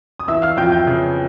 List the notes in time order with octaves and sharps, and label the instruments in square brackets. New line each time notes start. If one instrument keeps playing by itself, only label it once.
[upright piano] D#6
E3 E5 E6
F5 F6
F2 G5 G6
G5 G6
C#3